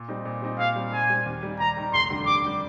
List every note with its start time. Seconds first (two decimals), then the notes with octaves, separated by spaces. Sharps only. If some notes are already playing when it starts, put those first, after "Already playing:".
Already playing: A#2
0.08 G3 C4 D#4
0.25 A#2
0.42 G3 C4 D#4
0.59 A#2 F5
0.76 G3 C4
0.92 A#2 G#5
1.10 G3 C4
1.26 D#2
1.43 D#3 G3
1.59 D#2 A#5
1.76 D#3 G3
1.93 F1 C6
2.10 D#2 D3 G3
2.26 F1 D6
2.45 D3 G3